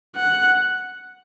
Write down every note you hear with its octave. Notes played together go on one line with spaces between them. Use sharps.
F#5